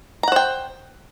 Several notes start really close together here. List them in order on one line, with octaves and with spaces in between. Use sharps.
A#5 F#5 C5 G5